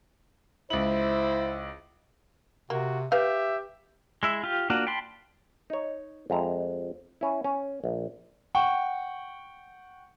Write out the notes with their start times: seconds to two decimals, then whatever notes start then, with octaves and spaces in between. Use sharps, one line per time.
0.70 C#2 E4 C5 F#7
2.70 C3 A#3 F#4
3.12 G4 B4 E5 F5
4.23 G#3 E4 E5
4.44 F4 G4
4.70 A#3 D4 F4 F#4
4.87 G5 A5 B5 C6
5.70 D#4 C#5
6.30 F2 G#3 E5 A#5
7.21 C#4 E4
7.44 C#4
7.84 A#1
8.55 F#5 G5 C#6